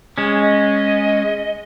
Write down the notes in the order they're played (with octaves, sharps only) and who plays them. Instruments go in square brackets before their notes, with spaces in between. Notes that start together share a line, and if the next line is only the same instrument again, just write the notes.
[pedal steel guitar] G#3 C#4
[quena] D#5